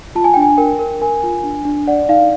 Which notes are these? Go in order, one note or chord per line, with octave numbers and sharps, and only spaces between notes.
F4 A5
G#5
D4 G5
G#5
A#4 G5
A#4
A#4 G#5
F4
D4
D4
D5 F#5
D#4 F5